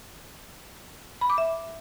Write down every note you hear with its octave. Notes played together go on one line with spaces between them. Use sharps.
B5
D6
E5